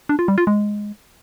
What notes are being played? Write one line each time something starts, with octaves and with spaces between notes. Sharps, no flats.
D4
F4
G3
F4
G#3